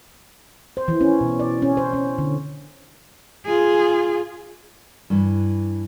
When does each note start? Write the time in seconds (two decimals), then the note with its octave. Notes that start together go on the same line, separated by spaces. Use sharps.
0.77 C5
0.88 E3
1.01 C#4
1.21 B2
1.40 D5
1.62 C#4
1.77 C5
1.93 C#4
2.18 D3
3.46 F4 G#4
5.10 G2 E3